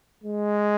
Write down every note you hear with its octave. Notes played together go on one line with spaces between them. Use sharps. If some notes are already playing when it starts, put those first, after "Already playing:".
G#3